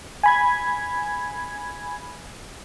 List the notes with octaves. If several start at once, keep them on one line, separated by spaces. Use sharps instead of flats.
G#5 B5 G#6